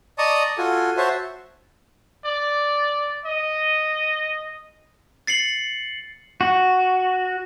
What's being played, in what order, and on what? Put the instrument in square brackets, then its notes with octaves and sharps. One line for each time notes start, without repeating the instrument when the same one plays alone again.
[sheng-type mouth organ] D5 D#5 A5 A#5 C#6 D#6
F4 F#4 A4 G#5
F#4 C5 C#5 E5 A5
[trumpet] D5
D#5
[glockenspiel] A6 C7 C#7 F#7
[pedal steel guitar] F#4